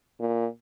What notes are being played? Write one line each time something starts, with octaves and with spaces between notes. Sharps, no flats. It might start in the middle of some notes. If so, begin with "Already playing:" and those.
A#2